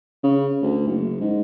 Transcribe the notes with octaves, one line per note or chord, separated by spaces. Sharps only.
C#3
D2
F#1
G#2